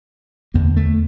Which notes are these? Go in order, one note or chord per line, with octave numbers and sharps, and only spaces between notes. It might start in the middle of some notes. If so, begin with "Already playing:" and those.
E2 D3 A#3
A3